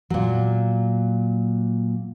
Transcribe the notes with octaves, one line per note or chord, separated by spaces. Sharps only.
A#2 F#3